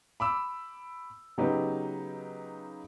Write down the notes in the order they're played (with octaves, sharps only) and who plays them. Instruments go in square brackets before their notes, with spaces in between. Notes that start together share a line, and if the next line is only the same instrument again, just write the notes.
[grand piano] B5 D6 E6
C#3 F#3 B3 D#4 G4 B4